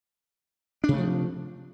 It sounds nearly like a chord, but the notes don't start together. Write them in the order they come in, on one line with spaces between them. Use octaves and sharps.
D4 C3 A3 F3